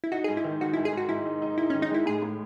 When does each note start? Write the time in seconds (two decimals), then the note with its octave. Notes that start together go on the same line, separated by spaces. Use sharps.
0.04 E4
0.12 D#4 F#4
0.24 G#2 G#4
0.37 E4
0.44 D#3
0.61 D#3 F#4
0.73 G#2 E4
0.85 G#4
0.93 G#2 F#4
1.09 G#2 E4
1.26 D#4
1.42 D#4
1.58 D#4 E4
1.70 D#3 C#4
1.82 D#4
1.90 G#3 E4
2.06 A2 G#4
2.22 A2